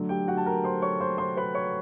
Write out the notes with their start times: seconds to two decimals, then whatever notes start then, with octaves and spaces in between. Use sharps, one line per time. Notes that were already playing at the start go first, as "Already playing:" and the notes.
Already playing: D3 F#3 A3
0.09 G4 G5
0.28 F#4 F#5
0.37 A5
0.46 A#4 A#5
0.64 C5 C6
0.82 C#5 C#6
1.00 C5 C6
1.18 C5 C6
1.37 B4 B5
1.54 C#5 C#6